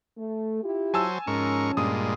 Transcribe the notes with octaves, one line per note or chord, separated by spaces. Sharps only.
A3
E4 F4 G4
F#3 C5 G#5 A5 E6
D#2 G#2 F3 C#4 A#4 C#6
G2 A#2 G#3 D#6